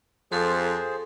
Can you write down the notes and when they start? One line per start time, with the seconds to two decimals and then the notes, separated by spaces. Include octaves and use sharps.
0.32 F2 F3 G#4 A4 C5 C6